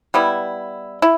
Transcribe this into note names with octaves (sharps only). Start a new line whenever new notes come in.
G3 B3 E4
E4